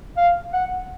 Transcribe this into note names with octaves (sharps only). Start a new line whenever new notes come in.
F5
F#5